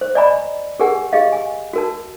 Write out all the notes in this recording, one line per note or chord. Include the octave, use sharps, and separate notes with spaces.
C5
D5 D#5 G#5 A#5 B5
G4 G#4 A#4 F#5 G#5
G4 G#4 D#5 F5
G#5
F#4 A#4 A5